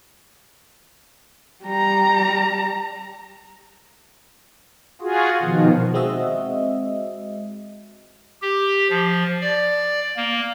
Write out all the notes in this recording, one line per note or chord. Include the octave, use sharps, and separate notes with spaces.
G3 A#5
F4 F#4 G#4
B2 D#3 F3
G#3 C4 F#4 D#5 E5
G4
F3
D5
A#3